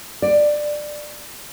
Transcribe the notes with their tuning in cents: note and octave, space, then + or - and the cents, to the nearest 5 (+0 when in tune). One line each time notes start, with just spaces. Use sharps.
D5 +15